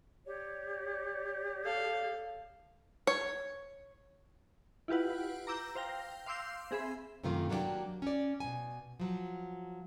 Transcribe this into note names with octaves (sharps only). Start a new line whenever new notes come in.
G4 C#5 D5
A4 F5
C#5
E4 F4 G4 B4 F#5
A#5 D6 E6 G6
C5 F5 G5 A#6
F5 C6 D6 E6 G6 C7
C4 G#4 E5 B5
F#2 C3 D#3 A3 A#3 F4
F#3 A#3 D4 F4 G4
C#4 D5
B2 G#5
F3 F#3